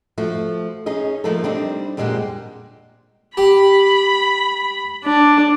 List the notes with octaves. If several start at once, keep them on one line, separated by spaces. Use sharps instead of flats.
F3 A3 F#4
C#4 D#4 G#4 D#5
F3 A3 A#3 D#4 A4
G3 C4 D4 D#4
F2 A#2 G3 G#3 C4 F#5
G4 B5
D4